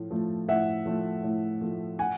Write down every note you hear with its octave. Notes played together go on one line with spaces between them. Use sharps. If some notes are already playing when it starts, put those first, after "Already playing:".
Already playing: A2 F3 A3
F3 A3
A2 E5 F#5
F3 A3
A2
F3 A3
F#5 G#5